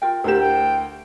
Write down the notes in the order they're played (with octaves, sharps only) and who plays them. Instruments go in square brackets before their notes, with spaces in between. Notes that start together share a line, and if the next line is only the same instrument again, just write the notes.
[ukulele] F4 A#4 G5
[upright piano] D2 A#4 E7 [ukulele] E4 G4
[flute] G5